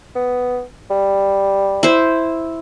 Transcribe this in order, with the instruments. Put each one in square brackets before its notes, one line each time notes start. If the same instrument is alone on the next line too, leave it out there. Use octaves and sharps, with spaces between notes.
[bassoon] B3
G3
[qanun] E4 C5